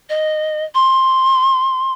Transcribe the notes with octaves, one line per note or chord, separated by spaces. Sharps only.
D#5
C6